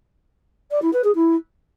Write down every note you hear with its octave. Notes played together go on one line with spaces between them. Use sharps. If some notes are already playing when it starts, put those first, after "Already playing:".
D5
E4
B4
G#4
E4